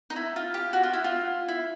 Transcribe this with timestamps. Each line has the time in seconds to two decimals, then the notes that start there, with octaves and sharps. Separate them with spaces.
0.10 D#4
0.16 E4
0.36 F4
0.54 G4
0.73 F#4
0.83 F4
0.93 E4
1.04 F4
1.48 E4